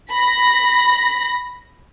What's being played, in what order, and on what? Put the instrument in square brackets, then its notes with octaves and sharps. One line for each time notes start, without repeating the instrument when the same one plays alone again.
[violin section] B5 A#6